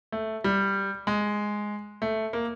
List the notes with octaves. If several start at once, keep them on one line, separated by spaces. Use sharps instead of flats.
A3
G3
G#3
A3
A#3